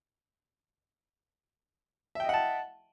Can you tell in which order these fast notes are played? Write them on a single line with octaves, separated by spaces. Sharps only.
E5 G5 D#5 F#5 A5